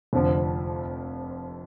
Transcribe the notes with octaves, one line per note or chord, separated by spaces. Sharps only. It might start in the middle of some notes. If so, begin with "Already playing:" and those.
F1 F2 D3 F3